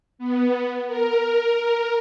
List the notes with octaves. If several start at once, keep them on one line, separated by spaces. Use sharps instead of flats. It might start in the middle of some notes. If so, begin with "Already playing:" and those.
B3
A#4